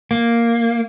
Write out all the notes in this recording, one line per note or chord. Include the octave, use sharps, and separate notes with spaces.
A#3